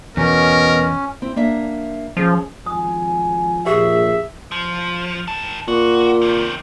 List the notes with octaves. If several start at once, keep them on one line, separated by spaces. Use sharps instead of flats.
E2 B2 C#4 A#4
C4 E4
A#3 D4 E5
F3 C#4 G#4
G#1 F3 G#5 D#6
A#1 G4 G#4 E5
F3
D#3 A5
A#2 F#4
C3 D#3